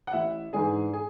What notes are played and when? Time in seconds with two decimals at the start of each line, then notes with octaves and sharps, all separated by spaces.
0.07 F#5
0.13 A1 E4 E5
0.53 G#2 E3 G#3 D4 G#4 G#5
0.93 G#4 G#5